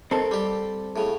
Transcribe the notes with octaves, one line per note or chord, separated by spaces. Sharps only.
D#3 C4 A4
G3 G4
A2 C#3